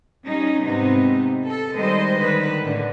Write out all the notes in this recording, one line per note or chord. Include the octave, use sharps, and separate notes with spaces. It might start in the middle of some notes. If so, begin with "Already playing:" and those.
G3 C#4 D#4
G#2 C3 B3 D#4
A4
D#3 G3 G#3 C5 D#5
D3 D#3 B4
A2 D3